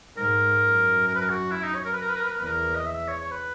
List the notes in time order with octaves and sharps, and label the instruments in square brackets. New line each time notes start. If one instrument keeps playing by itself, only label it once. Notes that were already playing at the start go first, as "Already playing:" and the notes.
[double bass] G#2 [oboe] A#4
[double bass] F#2
[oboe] A#4
B4
A#4
F#4
E4
D#4
C#5
A#4
B4
A#4
B4
A#4
B4
A#4
[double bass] E2 [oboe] B4
[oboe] A#4
D#5
E5
C#5
C#5
B4